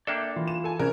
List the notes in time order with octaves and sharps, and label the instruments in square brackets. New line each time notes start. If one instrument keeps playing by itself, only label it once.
[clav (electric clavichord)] A#3 D4 A4 [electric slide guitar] D5 E5 G5
[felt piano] E3 [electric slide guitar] F4
[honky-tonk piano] E7
A4 G#5
[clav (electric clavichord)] A#1 [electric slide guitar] C3 C#4 G#5 [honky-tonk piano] A#4